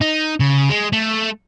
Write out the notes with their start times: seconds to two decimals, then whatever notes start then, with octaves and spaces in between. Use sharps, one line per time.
0.01 D#4
0.40 C#3
0.70 G#3
0.93 A3